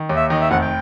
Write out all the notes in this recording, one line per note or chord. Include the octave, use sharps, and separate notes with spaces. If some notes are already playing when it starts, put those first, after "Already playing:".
Already playing: D#3
D#2
E5
D#3 D#5
E5
F1 F#5
G5